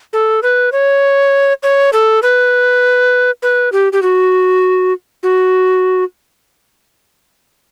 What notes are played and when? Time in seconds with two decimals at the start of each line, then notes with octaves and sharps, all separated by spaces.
0.13 A4
0.43 B4
0.72 C#5
1.63 C#5
1.93 A4
2.23 B4
3.42 B4
3.72 G4
3.93 G4
4.02 F#4
5.23 F#4